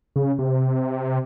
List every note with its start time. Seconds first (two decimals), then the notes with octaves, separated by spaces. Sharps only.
0.16 C#3
0.39 C3